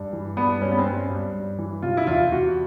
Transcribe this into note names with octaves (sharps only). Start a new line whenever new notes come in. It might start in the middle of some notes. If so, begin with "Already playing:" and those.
Already playing: G2
E3
G2 B3
G2 C#4
B3
C4
G2 C#4
G2
G2
E3
C3 F4
E4
E2 F4
C3 F#4